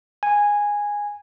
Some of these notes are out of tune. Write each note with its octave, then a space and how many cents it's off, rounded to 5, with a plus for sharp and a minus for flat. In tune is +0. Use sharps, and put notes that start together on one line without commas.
G#5 -10